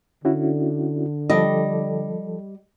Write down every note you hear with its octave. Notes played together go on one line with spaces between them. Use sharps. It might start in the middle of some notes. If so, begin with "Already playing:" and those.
D3 C#4 E4 F#4
F3 G3 G4 A4 D#5